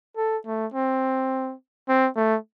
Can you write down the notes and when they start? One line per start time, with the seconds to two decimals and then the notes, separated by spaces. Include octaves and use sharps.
0.17 A4
0.46 A3
0.74 C4
1.88 C4
2.16 A3